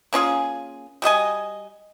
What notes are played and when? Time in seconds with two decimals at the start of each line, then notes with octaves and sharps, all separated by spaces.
0.13 A#3 C#4 F4 G#4
1.02 G3 F#4 D#5 G#5